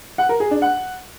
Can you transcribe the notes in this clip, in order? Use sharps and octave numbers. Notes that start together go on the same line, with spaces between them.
F#5
A#4
G#4
D4
F#5